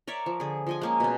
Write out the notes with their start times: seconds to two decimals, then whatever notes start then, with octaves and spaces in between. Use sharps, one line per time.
0.07 A#4 C#5 D5 E5
0.26 F3
0.40 D3 G#4
0.67 F3 D#5 G#5
0.81 G#3 A#3 C#4
1.00 B2 C#4